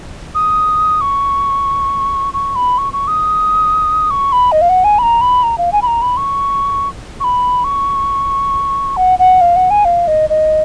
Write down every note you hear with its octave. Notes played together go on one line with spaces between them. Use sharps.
D#6
C#6
C#6
B5
C#6
C#6
D#6
C#6
B5
D#5
F5
F#5
G#5
B5
A#5
B5
A#5
F5
G#5
B5
A#5
B5
C#6
C#6
B5
C#6
F#5
F#5
F5
F#5
G#5
F5
D#5
D#5